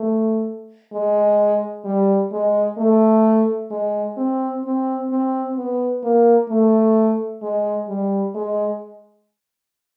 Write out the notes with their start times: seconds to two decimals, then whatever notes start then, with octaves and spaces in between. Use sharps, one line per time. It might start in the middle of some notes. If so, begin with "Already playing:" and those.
Already playing: A3
0.93 G#3
1.85 G3
2.32 G#3
2.77 A3
3.71 G#3
4.17 C4
4.64 C4
5.10 C4
5.56 B3
6.03 A#3
6.49 A3
7.42 G#3
7.88 G3
8.34 G#3